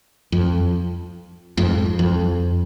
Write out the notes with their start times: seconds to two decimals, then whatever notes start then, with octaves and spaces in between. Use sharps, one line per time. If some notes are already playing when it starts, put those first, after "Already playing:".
0.32 F2
1.57 F2 G#2
1.99 F2